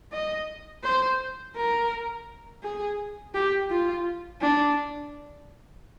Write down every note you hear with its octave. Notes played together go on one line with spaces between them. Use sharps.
D#5
C5
A#4
G#4
G4
F4
D4